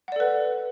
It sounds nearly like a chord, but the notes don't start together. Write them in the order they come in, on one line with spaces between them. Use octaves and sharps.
F#5 D5 A4 B4